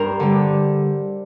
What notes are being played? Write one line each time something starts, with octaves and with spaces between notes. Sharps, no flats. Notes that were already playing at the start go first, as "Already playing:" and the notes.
Already playing: G2 A#4 C5
D3 G3